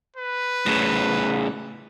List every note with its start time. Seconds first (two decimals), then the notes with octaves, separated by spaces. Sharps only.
0.16 B4
0.66 A2 C#3